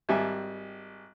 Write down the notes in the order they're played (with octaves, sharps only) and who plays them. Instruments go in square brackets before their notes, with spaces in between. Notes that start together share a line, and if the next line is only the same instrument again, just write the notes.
[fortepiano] G#1 G3 E5 G#5